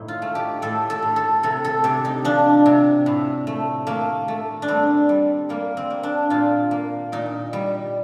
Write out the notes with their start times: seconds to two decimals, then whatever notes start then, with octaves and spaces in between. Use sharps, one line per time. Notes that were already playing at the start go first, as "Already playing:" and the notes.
Already playing: A2 D#4
0.08 F4
0.22 A3
0.35 G4
0.62 A2 A4
0.90 A4
1.02 A2
1.16 A4
1.43 C3 A4
1.65 A4
1.84 C3 G4
2.05 D#4
2.24 F3 D4
2.66 C3
3.06 A2
3.47 A3
3.87 A3 A#3
4.28 A3
4.62 D4
4.68 G3 C4
5.09 G3
5.49 G3 A#3
5.77 C4
5.90 A#3
6.03 D4
6.30 A#2 F4
6.71 A#3
7.12 A#2 D#4
7.53 G3